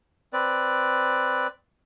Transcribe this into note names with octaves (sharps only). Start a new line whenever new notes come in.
C4 B4 D5